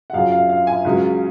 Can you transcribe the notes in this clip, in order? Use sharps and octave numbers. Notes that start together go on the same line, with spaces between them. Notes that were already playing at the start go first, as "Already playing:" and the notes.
F#5
F#2 C#3 F3 F5
F5
F5
G#5
C#2 C#3 F#3